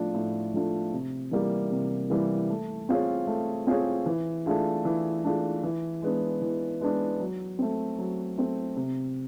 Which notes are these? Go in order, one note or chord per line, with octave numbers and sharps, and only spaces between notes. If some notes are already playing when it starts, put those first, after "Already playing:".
Already playing: A2 F3 A3 D4 F4
A2
F3 A3 D4 F4
C3
E3 G3 A#3
C3
E3 G3 A#3
A3
C4 F4 G#4 C#5
A3
C4 F4 G#4 C#5
E3
A3 D4 F4 G#4
E3
A3 D4 F4 G#4
E3
G#3 B3 D4
E3
G#3 B3 D4
F#3
A3 C4
F#3
A3 C4
C3